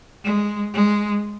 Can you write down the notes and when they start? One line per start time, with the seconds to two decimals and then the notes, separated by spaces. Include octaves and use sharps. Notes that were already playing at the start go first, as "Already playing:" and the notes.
0.24 G#3
0.74 G#3